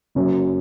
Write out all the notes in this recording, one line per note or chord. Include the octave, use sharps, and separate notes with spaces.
F#1 F#2 F#3 C#4